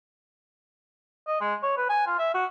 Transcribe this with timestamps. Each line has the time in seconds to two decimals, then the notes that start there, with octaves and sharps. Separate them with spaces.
1.27 D#5
1.41 G#3
1.63 C#5
1.77 B4
1.89 G#5
2.07 F4
2.19 E5
2.34 F#4